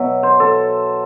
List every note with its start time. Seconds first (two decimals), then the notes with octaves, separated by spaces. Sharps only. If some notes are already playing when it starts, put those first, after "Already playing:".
Already playing: B2 F#3 E5
0.23 C5
0.40 A4